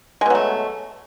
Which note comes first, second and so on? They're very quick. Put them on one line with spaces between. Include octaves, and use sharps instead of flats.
G#3 B2 F#3 A3